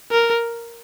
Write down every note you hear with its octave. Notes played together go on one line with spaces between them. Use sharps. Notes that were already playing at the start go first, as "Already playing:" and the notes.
A#4